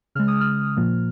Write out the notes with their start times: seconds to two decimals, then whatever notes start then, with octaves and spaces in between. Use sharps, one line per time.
0.15 C#3 G#3 F6
0.28 D#6
0.41 F6
0.76 A#2 F3 A#3